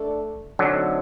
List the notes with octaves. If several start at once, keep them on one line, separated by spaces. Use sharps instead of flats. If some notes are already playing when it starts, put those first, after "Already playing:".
Already playing: A3 D4 A4 D5
A2 D3 F#3 A3 C4 D#4 A4